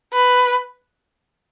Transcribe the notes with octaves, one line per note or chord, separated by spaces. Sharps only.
B4